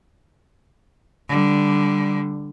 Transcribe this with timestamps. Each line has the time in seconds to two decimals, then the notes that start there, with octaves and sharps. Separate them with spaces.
1.29 D3 G3